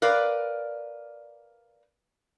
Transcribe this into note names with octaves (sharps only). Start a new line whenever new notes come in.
A#4 B4 D5 F5